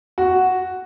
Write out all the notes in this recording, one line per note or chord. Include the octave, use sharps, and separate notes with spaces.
F#4